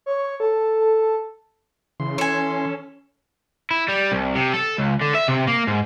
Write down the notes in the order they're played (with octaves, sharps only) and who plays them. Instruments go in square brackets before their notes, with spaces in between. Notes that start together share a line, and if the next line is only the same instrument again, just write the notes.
[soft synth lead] C#5
A4
[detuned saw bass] C#3 [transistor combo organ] E3 C6
[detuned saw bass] C#4 [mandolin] A4 G#5
[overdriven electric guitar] E4
G3
C2
C3
A4
C#2
D3
E5
C3
A#3
G#2